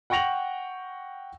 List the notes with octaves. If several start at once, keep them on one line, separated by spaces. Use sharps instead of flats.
F#5 G5 C#6 A#6 F7 F#7